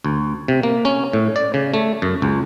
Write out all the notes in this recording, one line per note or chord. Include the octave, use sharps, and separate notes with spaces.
D2
C3
A#3
C#4
A2
D5
C#3
A3
F#2
C#2